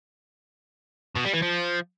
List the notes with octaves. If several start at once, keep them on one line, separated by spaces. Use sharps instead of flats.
B2
G3
E3
F3